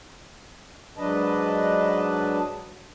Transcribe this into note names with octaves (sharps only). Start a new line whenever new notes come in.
G#2 F#3 D4 B4 D#5 A5